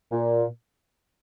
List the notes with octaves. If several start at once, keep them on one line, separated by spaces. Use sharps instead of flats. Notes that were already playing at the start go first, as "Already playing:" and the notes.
A#2